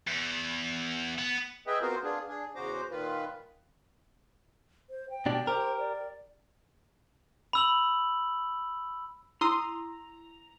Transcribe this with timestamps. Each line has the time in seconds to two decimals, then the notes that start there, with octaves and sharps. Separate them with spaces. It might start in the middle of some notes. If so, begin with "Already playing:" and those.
0.08 E2
1.18 B3
1.67 G#4 B4 D#5 E5 G5
1.81 B3 C4 F4 F#4 A#4 C5
2.04 B3 D4 F4 G#4
2.28 D4 G#4
2.56 E2 C#3 F#4 C5 A#5 D6
2.91 A#2 D#3 F4 B4
4.90 C5
5.10 G5
5.26 B2 D4 G4
5.47 G4 A#4 C5
5.79 D5
7.53 B5 E6 F#7
9.41 E4 A#5 C6 D#6 E6